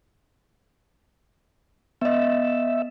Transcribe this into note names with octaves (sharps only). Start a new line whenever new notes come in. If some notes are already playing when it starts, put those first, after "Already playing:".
B3 D#5 E5